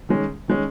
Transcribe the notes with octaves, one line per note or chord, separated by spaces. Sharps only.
D#3 G#3 C#4
D#3 G#3 C#4